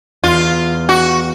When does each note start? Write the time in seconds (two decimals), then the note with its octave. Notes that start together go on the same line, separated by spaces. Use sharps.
0.24 E2 F4
0.89 F#4